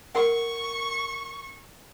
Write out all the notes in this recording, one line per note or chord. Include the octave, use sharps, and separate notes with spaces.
A#4 F#5 C#6